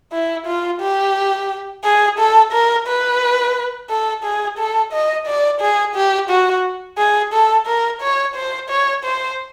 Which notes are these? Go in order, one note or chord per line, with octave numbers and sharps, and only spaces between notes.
E4
F4
G4
G#4
A4
A#4
B4
A4
G#4
A4
D#5
D5
G#4
G4
F#4
G#4
A4
A#4
C#5
C5
C#5
C5